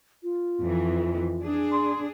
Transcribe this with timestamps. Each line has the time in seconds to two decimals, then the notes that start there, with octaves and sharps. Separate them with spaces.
0.23 F4
0.61 F2 E3
1.43 D4 G#4
1.72 C6